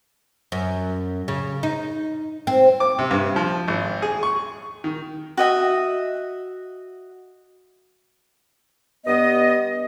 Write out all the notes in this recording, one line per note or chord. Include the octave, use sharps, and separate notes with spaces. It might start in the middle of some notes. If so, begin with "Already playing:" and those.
F#2
C#3
D#4
C4
D6
C3
G2
F3
G#1
G#4
C#6
D#3
F#4 D#5 E5
G2 B3 D#5